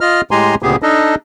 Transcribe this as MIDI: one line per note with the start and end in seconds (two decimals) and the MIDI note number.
0.01 0.21 65
0.01 0.21 75
0.01 0.21 89
0.31 0.55 45
0.31 0.55 56
0.31 0.55 67
0.31 0.55 80
0.31 0.55 82
0.31 0.55 84
0.63 0.76 38
0.63 0.76 46
0.63 0.76 49
0.63 0.76 59
0.63 0.76 67
0.63 0.76 68
0.82 1.15 62
0.82 1.15 63
0.82 1.15 69
0.82 1.15 75